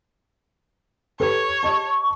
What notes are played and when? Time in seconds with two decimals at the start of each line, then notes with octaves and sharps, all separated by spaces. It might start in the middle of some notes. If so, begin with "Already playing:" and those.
1.20 G4 A4 B4 C#5
1.63 G4 D#5 A5 C#6